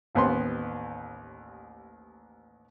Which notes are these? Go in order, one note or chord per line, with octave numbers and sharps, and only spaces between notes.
A1 D#2 B3 C4 C6